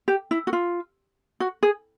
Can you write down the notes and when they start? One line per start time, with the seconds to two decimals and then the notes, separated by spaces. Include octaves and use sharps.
0.08 G4
0.31 E4
0.47 F#4
0.53 F4
1.40 F#4
1.63 G#4